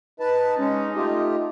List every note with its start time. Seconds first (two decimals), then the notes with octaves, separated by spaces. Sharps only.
0.20 D#4 B4 A5
0.59 G#3 C#4
0.96 A3 F4 G4